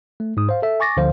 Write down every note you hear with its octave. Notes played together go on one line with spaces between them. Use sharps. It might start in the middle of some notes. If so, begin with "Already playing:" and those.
A3
G#2 D#6
C5 F5
A4 E5
G#5 C#6 D6 A6 A#6
D2 D3 F3 C5 F5